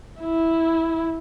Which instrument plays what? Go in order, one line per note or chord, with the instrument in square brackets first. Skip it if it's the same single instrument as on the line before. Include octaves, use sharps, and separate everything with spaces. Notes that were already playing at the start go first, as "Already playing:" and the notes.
[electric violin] E4